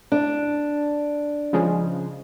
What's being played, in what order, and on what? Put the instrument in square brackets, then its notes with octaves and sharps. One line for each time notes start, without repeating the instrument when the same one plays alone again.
[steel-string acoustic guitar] D4
[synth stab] C#3 F3 G#3